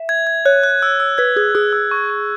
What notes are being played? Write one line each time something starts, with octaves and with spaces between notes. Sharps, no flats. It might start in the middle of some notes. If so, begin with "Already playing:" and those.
Already playing: E5
G#6
G#6
C#5 F#6
F#6
E6
E6
B4 G#6
G#4 G#6
G#4 E6
E6
C#6
C#6